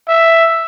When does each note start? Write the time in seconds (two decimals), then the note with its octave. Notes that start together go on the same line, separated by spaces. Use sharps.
0.09 E5